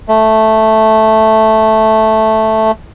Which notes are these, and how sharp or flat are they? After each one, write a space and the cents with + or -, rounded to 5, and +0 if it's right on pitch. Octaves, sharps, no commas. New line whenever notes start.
A3 -5